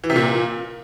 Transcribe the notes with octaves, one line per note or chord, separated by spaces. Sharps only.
E3
C3
A#2